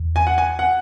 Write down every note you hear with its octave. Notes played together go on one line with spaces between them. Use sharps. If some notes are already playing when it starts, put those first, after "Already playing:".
Already playing: E2
G#5
F#5
G#5
F#5